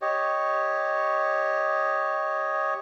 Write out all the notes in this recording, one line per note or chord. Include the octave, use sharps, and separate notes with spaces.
G4 C#5 D#5